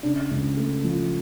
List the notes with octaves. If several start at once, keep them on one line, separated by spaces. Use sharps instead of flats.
C#3 D4
C#2
A3
F3